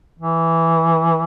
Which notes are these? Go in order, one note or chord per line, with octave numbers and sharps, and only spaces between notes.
E3